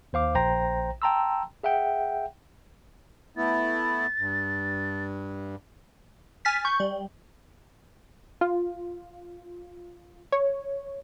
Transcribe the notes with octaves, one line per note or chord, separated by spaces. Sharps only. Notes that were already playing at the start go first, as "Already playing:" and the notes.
D#2 C5 F5 D6
A#1 C5 G5 A#5 A#6
G5 A5 A#5 C6 E6
G#4 E5 F#5 G5
A3 B3 E4 A6
G2
G#5 F6 A6 B6
C#6 G6
G3
F4
C#5